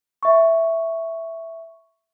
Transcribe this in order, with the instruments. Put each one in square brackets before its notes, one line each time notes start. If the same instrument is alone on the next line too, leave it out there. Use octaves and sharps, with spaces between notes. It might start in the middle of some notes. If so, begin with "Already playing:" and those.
[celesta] E5 C#6